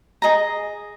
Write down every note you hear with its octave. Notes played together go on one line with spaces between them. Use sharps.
G#4 D#5 A#5